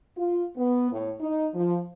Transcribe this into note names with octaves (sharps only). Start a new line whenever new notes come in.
F4
B3
A2
D#4
F3